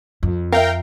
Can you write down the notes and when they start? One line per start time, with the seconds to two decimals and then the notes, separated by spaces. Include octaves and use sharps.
0.23 F2
0.52 A#4 E5 F5 G5